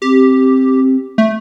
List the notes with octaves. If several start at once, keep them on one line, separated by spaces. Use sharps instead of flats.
C4 G4
A3